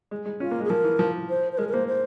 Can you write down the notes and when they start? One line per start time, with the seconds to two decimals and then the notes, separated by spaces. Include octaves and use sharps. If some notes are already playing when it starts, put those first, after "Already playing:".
0.11 G#3
0.26 G#3
0.40 C#4 F4
0.51 A#3
0.60 G#3 G#4
0.70 F3 A#4
0.84 E3
0.99 F3
1.30 C5
1.53 C5
1.58 G#3 A#4
1.69 A#4
1.73 A#3 C5
1.88 C5